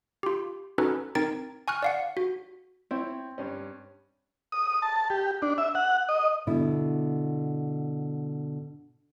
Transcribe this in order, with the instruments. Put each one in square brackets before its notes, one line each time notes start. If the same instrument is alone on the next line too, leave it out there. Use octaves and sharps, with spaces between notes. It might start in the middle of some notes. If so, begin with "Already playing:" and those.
[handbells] F4 G4
C#4 D#4 F#4 A4 B4
C4 D#4 A#4 A6 D7
G#5 C#6 F6 F#6
D5 F5 F#5
F#4
[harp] C4 [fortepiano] E4 C#5
[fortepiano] G2 C#4
[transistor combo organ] D#6
A5
G4
D4
E5
F#5
D#5
[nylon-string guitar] B2 D3 E4